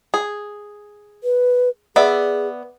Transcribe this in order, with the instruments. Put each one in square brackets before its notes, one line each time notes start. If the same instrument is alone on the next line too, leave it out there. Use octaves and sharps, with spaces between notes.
[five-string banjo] G#4
[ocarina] B4
[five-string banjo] B3 D5 E5 [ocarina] G#4